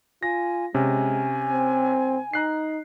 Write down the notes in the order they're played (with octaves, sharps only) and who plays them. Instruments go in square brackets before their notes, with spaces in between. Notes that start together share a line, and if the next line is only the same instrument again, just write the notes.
[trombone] F4 [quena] G#5 [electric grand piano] A#6
[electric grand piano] C3 C#4 [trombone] G#3 [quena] G#5
[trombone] C4
[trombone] D#4 [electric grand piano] A#5 F#6 C7